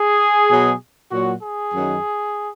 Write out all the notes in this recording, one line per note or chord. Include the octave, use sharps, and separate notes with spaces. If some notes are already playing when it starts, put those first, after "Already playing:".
Already playing: G#4
B2 F#3
A#2 F#3 F#4
G#4
F#2 D#3 F#3